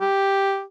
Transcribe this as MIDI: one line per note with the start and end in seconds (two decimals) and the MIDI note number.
0.01 0.62 67